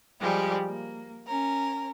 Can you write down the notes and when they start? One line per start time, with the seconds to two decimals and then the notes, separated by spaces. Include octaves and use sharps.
0.21 F3 G3 G#3 G4
0.67 A#3
1.28 C#4 A#4